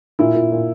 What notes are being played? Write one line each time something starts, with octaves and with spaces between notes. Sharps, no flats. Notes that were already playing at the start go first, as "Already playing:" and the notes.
A#2 E4
A#2
A#2